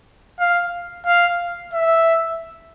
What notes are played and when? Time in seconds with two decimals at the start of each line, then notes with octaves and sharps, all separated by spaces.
0.40 F5
1.06 F5
1.73 E5